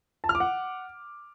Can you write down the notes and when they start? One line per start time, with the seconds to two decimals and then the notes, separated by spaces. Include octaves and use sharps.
0.24 A5
0.29 F6
0.35 D6
0.40 F#5